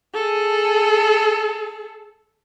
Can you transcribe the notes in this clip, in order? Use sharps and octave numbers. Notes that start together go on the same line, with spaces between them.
G#4 A4